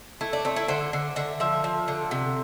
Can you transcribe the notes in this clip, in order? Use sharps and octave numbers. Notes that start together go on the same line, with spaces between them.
A3 E4
D4
A3 C4
E4
D3 C5
D3
D3 E5
F3 E5
F3
D3
C3